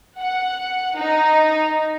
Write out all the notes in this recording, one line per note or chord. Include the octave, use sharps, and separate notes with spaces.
F#5
D#4